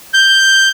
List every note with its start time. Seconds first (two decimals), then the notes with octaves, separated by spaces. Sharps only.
0.14 G6